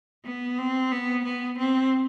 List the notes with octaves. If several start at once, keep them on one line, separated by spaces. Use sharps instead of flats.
B3
C4
B3
B3
C4